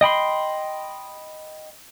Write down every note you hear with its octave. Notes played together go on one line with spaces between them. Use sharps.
D#5 G5 B5 C6